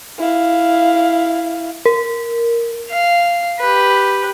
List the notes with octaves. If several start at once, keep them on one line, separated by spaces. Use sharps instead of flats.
E4 F5
A#4
F5
G4 B4